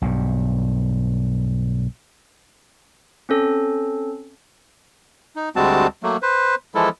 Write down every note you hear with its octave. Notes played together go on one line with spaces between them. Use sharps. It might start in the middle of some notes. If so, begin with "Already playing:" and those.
B1 G2
C4 C#4 A4
D#4
D2 G3 G#3 C4 F#4 A5
F#3 A3 A#3
B4 C5
E3 F3 G#3 E4 A4